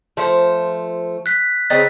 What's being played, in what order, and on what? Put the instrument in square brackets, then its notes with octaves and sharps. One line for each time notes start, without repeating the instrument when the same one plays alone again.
[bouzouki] F3 A3 C5
[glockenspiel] F#6 B6
[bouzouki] C#3 C4 D#4 [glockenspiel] A6 B6